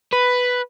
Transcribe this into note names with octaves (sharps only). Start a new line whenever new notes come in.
B4